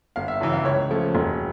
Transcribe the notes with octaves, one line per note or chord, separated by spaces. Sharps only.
G1 F5
E5
F#2 C#3 E3
F5
C#2 C#5
C#3 F3 A3
E1